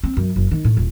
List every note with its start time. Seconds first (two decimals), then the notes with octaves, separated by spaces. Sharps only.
0.04 C4
0.17 F#2
0.36 F#1
0.51 D#3
0.64 A2
0.77 D#1